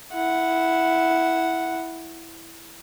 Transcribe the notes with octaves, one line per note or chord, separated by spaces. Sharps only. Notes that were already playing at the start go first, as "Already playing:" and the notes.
E4 F#5